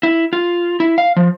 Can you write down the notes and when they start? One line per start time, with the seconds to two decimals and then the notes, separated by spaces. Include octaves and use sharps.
0.03 E4
0.33 F4
0.80 E4
0.98 F5
1.16 F3